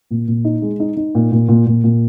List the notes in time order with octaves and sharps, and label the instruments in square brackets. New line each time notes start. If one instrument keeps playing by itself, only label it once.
[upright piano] A#2
A#2
D#4
G#3
D#4
D#4
A#2
A#2
A#2
A#2
A#2